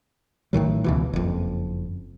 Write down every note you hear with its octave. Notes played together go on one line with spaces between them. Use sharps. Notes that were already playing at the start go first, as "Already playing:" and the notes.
A1 A2 D#3 F#3
C#2 B2 E3
F#1 F2